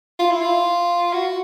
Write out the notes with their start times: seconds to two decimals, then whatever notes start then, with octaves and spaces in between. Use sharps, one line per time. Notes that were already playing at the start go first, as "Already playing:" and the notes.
0.19 F4
0.31 E4
0.41 F4
1.13 F#4